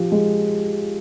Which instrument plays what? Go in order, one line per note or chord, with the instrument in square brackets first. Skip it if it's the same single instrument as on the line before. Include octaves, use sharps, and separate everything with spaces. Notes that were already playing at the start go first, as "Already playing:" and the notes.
Already playing: [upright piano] F3 G4
G#3